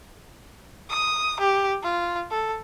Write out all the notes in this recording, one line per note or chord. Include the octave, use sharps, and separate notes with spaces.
D#6
G4
F4
A4